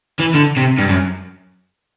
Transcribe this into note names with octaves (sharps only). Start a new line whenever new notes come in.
E3
D3
C3
G2
F#2